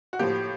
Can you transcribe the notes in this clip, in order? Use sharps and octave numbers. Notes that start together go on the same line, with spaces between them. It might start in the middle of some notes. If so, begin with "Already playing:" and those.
F#4
A2 F3 A#3 G4